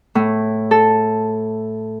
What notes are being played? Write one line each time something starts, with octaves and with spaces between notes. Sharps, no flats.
A2
A4